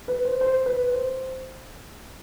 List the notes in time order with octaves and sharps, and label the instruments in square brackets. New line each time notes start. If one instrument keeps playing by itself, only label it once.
[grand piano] B4
C5
C5
B4
C5